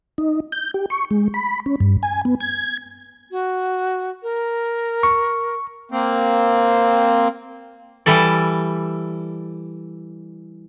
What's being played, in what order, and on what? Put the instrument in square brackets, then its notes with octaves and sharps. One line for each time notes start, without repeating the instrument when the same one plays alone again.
[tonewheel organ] D#4
G6
G4
C#6
G#3
B5
C#4
G2
G#5
B3
G#6
[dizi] F#4
A#4
[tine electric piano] C#6
[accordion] A#3 C4
[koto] E3 G3 A4 D5